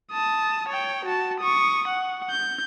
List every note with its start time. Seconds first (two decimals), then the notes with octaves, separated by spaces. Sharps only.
0.12 A5 D#6
0.68 C#5 G5
1.05 F#4 A5
1.40 C#6 D#6
1.87 F#5
2.30 G6